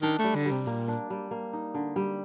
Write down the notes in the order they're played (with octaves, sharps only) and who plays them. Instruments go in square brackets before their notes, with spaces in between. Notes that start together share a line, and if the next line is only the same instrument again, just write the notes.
[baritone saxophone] D#3 [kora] D4
[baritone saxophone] A3
[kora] G3
[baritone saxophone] D3
[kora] G3
[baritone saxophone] C3
[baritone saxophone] A#2 [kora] A#3
[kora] D4
G3
A#3
D#4
D3
G3